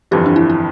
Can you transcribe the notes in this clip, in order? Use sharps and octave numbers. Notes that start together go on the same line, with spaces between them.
G1 F2 E3 G4
D4
E4
E4